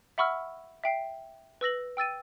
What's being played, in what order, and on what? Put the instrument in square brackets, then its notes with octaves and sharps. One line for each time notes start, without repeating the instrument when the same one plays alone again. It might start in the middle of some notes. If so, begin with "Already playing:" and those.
[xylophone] E5 F#5 B5 C#6 E6 F6
E5 G5 C7
B4 E6 A#6 F#7
G5 E6 A6 D#7